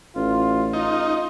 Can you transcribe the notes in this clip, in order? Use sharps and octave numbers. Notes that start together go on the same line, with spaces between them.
A1 F4
D#4 F4